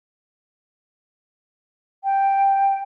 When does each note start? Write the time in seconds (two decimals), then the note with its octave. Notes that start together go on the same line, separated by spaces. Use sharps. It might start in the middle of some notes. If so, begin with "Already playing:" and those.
2.04 G5